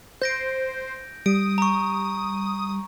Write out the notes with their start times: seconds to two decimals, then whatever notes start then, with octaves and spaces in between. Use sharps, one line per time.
0.22 C5 G6 A#6 D7
1.26 G3 D#6 D7
1.58 A#5 C#6